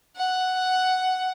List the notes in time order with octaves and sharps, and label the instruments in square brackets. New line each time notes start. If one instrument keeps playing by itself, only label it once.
[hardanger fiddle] F#5